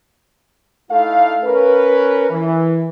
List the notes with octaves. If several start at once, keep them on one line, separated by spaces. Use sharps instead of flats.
A3 D#4 E4 A4 F5
C#4 A#4 B4
E3